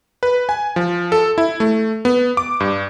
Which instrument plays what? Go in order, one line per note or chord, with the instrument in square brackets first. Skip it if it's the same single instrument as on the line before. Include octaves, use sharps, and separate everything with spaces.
[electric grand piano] B4
G#5
F3
A4
E4
A3
B3
D6
G2